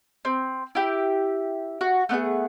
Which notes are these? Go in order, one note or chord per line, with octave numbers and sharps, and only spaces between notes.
C4
E4 G4
F#4
A3 B3 D4 G#4